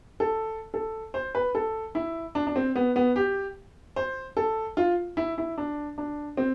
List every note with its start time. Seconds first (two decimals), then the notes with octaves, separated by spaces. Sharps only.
0.20 A4
0.74 A4
1.14 C5
1.35 B4
1.55 A4
1.95 E4
2.35 D4
2.47 D4
2.56 C4
2.76 B3
2.96 B3
3.16 G4
3.96 C5
4.37 A4
4.77 F4
5.17 E4
5.38 E4
5.58 D4
5.98 D4
6.37 C4